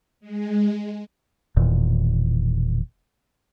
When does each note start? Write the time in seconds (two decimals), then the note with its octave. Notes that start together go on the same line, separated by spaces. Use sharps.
0.20 G#3
1.57 E1 E2 A#2 D#3